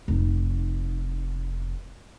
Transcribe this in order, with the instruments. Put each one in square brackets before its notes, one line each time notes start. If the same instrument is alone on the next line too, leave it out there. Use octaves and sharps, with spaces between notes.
[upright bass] F1 D#4